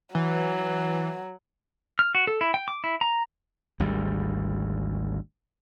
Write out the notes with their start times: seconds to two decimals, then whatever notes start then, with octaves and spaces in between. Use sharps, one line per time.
0.15 E3 F#3
1.99 F6
2.15 F#4
2.27 A4
2.41 E4
2.54 G5
2.68 D6
2.84 E4
3.01 A#5
3.80 G#1 D2 G3